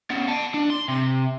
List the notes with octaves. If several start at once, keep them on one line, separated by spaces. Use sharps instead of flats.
B3 C#4
F#5 A5
D4
C6
C3